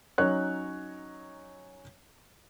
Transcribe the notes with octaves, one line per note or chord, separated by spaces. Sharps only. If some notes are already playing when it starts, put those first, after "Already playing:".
F#3 C#4 D#4 C#5 F#6